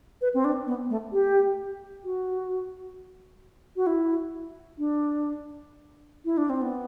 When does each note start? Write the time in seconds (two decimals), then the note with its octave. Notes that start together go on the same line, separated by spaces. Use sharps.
0.21 B4
0.34 C4
0.45 D4
0.67 B3
0.90 A3
1.13 G4
2.04 F#4
3.76 F#4
3.87 E4
4.78 D4
6.25 E4
6.37 D4
6.50 C4
6.62 B3